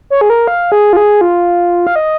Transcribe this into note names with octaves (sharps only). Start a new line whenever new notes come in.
C#5
G#4
A#4
F5
G#4
F4
G#4
F4
F5
D#5